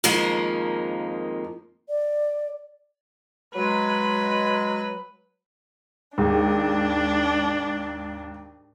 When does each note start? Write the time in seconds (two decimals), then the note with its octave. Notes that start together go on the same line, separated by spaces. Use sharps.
0.04 F2 D#3 F3 G#3 A#3
1.88 D5
3.56 F#3 G#3 B4
6.18 D#2 G#2 D4